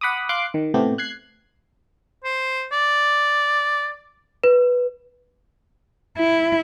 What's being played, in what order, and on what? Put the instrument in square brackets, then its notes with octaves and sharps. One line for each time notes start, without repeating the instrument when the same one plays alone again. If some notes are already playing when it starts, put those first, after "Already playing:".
[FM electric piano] F#5 B5 D6 D#6
F5 C6 D6 F#6
D#3
A2 C3 A3 B3 G4
F#6 G#6 C7
[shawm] C5
D5
[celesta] B4
[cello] E4